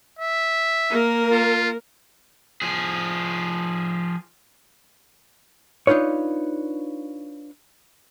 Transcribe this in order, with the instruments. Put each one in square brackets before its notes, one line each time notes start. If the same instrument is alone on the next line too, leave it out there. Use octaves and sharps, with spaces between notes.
[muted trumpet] E5
[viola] A#3 A#4
[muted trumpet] F4
[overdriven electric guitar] F3 G#4
[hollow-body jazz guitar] D4 D#4 F4 B4 C#5